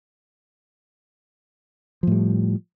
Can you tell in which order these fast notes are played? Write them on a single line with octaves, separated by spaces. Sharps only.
F3 A2 G3